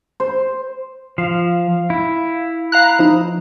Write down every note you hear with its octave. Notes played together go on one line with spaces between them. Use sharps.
C5
F3 F5
E4
F5 A#5 F#6
F3 D#4